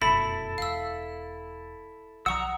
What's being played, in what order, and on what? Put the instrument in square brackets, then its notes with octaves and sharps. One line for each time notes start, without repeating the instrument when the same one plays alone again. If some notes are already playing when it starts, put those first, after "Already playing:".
[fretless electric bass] F1 F#2 B2 [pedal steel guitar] E4 A4 E5 [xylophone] B5
[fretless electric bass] E1 [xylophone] F5 E6
[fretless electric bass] B1 F3 [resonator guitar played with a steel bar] F#5 [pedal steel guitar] A#5 E6 [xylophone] C#6 D#6